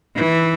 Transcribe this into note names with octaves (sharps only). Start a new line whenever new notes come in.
E3